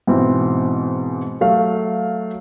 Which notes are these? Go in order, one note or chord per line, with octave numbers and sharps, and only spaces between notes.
G#2 B2 E3 C4
F#3 A3 F5